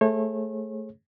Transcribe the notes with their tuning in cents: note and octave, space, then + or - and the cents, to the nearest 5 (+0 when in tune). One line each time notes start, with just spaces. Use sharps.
A3 +0 G#4 +0 C#5 -35